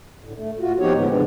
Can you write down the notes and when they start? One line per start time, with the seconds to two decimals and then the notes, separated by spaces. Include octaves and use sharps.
0.24 A2 D3
0.37 A3
0.59 A2 F4 F#4
0.79 F3 B3 C4 D#4 G4 C#5
0.93 A2 D3 E3 F3 G#3 B3
1.11 C#3 E3 G#3 D4